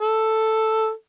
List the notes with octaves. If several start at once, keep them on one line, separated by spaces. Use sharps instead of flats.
A4